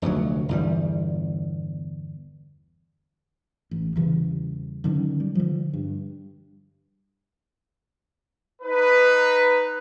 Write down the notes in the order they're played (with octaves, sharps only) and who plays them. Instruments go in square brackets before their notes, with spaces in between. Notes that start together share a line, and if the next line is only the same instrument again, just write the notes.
[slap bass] F1 D2 C3 F#3
G1 E2 G3
[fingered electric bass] A1
E2 C#3 E3 G3
D3 D#3 F#3 C#4
G3
D3 F3
G2
[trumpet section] D#4 B4